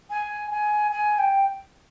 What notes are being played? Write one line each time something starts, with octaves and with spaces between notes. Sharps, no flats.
G#5
G#5
G#5
G5